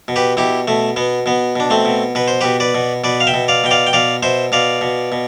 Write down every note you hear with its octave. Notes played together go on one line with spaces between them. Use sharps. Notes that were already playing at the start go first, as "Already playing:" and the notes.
B2
G4 B4
B2 E4 G4
B2 A3
B2 B3
B2 B3
B2 D4
A3 C4
B2
B2 B4
C5
B2 G4 B4
B4 D5
B2
B2 B4 D5
F5
E5 G5
B2
D5 F5
B2 G5
D5 F5
G5
B2 D5 F5
B2 C5 E5
B2 D5 F5
B2
B2